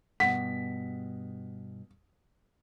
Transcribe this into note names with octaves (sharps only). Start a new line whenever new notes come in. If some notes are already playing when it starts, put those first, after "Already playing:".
G2 B2 F#5 B6